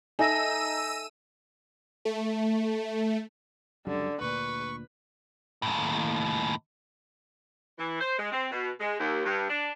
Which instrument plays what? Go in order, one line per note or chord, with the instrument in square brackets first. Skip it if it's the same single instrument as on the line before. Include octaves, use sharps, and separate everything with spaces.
[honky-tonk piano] D#4 [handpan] A4 E5 [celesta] G#5 A#6 [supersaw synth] E6 D#7
[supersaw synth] A3
[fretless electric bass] C#2 F#2 G3 [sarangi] D3
[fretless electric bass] D2 A#2 [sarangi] B4 [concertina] C#6
[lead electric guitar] D#2 A2
[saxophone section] E3
C5
G#3
C4
B2
G#3
D#2
G2
D4